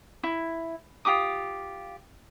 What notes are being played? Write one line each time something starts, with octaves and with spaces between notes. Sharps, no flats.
E4
F4 G4 D6 D#6